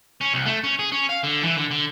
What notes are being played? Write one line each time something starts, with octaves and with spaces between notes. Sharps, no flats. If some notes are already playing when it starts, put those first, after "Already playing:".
C#4
C2
A3
C#4
G#4
C#4
F5
D3
E3
D3
D3